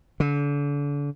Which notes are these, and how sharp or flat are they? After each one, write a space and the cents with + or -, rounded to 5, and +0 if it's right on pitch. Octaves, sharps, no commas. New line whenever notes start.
D3 -35